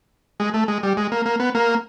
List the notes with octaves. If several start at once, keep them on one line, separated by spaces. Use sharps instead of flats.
G#3
A3
G#3
G3
G#3
A#3
A#3
B3
A#3